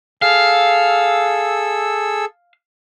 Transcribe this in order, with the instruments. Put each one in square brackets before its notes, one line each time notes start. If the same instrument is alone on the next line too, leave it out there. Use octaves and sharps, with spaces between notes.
[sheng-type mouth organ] G#4 A4 E6 [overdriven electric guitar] F5